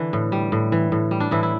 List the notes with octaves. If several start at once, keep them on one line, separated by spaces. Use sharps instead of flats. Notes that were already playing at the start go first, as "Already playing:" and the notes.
Already playing: D3 E3 D4
A2
G3
A2
E3
A2
G3
D4
A2 E3 E4
E4